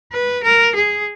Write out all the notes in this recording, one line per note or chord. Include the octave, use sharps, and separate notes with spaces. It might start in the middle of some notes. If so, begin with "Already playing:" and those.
B4
A#4
G#4